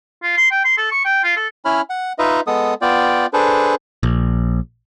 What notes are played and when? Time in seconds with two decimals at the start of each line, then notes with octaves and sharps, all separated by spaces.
0.23 F4
0.37 C6
0.51 G5
0.64 C6
0.78 A4
0.92 C#6
1.05 G5
1.24 F4
1.37 A4
1.65 C#4 E4 C#5 B5 F6
1.90 F#5
2.19 D#4 F4 B4 D#5 E5
2.47 G#3 B3 A4 D#6
2.82 B3 F4 D5 G5
3.33 D4 G#4 A4 B4 C5
4.03 A#1